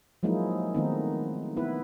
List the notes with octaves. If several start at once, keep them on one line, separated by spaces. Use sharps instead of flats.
F3 F#3 G#3 A#3 D#4 E4
D#3 A3 B3 C4 D#4
B3 E4 B4